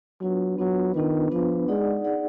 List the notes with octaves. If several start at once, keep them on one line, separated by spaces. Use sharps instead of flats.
F#3 B3 D4 F4 B4
F#3 B3 D4 F4 B4
D#3 B3 D4 F4 B4
F3 B3 D4 F4 B4
G#3 D#4 G#4 D5 F#5
D#4 G#4 D5 F#5